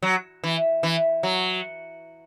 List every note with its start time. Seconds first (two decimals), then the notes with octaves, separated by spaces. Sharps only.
0.03 F#3
0.44 E3
0.83 E3
1.23 F#3